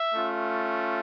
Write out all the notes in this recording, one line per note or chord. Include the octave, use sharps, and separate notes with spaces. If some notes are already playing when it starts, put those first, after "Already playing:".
Already playing: E5
A3 C#4 F4